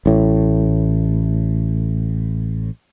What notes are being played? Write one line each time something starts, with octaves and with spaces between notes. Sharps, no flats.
A1 A2